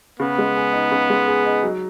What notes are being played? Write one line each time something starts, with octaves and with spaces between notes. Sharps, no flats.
C#3 B3
G#3
G#4
D#4
C#3
G#3
G#4
D#4
F#3